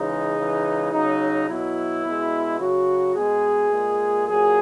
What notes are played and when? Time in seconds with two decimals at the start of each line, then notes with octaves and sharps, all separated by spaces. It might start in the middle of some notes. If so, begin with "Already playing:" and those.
Already playing: C#3 E3 G#3 D#4
0.36 C#3 E3 G#3
0.92 C#3 F#3 D#4
1.48 B2 F#3 E4
2.04 B2 G#3
2.59 C#3 F#3 F#4
3.15 B2 G#3 G#4
3.72 A#2 G#3
4.27 A#2 F#3 G#4